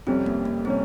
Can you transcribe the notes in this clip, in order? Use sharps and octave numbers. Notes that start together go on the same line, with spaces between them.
F2 C3 G3 C4 C#4
A#3
A#3
C3 G3 C4 C#4